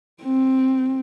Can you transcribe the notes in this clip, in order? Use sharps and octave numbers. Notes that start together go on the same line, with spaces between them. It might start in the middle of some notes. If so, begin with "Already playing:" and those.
C4